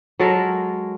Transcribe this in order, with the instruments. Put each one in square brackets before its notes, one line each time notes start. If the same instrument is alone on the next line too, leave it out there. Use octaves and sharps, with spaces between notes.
[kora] F#3 G#3 A4 A#4